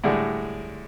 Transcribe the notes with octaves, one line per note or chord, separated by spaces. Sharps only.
A2 D3 G3 G#3